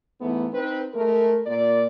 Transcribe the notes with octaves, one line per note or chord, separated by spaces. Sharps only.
G#2 E3 A3 B3
C4 D#4 B4
G#3 A3 A#4
A#2 D5